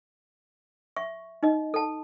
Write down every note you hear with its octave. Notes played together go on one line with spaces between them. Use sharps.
E5 C#6
D#4 D#5
A4 A5